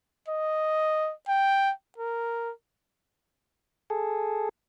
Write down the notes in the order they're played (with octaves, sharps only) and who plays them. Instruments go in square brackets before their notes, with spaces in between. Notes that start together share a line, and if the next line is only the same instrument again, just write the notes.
[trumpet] D#5
G5
A#4
[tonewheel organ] G#4 A4